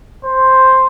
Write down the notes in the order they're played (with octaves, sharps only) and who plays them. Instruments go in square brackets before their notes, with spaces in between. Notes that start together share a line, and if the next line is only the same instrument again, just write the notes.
[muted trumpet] C5